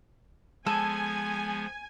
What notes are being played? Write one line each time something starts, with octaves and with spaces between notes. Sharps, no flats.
F3 G#3 B3 A4 G#5